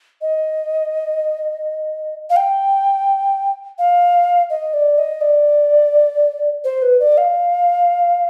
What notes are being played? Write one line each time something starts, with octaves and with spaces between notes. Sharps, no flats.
D#5
F5
G5
F5
D#5
D5
D#5
D5
C5
B4
D5
F5